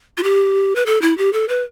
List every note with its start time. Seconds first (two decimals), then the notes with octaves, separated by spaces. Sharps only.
0.17 F4
0.23 G4
0.76 B4
0.86 A4
1.02 E4
1.18 G4
1.33 A4
1.49 B4